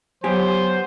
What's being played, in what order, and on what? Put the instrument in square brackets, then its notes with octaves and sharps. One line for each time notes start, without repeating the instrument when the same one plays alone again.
[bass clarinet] F#3 [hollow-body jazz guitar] B3 G4 G#5 [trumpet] C5